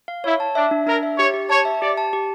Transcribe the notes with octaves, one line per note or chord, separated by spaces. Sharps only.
F5
E4 C#5
A5
D4 E5
D4
D4 A#4
E5
G4 C#5
G4
C#5 A5
E5
G4 D5
A5
G4